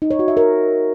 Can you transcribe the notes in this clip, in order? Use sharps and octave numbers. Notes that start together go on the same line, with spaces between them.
D#4
C#5
F#4
E5
A#4